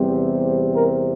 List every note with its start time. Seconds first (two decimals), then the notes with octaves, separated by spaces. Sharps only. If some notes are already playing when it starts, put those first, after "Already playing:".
Already playing: E2 C3 G3 C4
0.76 A#4